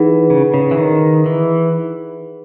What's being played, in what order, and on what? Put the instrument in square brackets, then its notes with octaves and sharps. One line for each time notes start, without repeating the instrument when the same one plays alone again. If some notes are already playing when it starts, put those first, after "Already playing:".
Already playing: [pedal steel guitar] E3 [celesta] D#4 G#4 B4 F#5
[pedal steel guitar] C#3
C#3
E3
D#3
E3